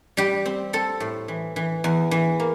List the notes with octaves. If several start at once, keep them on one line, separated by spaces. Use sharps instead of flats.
G3 G4
C4
C4 A4
A2
E3
E3
E2
E3
A#3